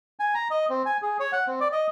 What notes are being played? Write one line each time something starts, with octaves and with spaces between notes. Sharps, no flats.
G#5
A#5
D#5
C4
G#5
G#4
C#5
F#5
C4
D5
D#5